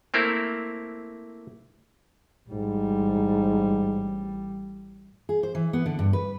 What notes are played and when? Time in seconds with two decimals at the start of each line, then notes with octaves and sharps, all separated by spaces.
0.14 A3 A#3 C4 E4 A#4
2.49 A1 G#2 G3
5.29 G#4
5.43 C5
5.55 E3
5.73 B3
5.86 D3
5.99 G2
6.13 B4